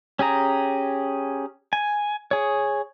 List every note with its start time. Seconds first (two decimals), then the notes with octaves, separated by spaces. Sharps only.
0.19 C#4 G4 G#4 A#5
1.73 G#5
2.31 G#4 C#5